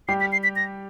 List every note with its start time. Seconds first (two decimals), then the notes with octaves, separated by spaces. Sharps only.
0.08 G3 G4 C7
0.20 B6
0.32 C7
0.43 B6
0.56 A#6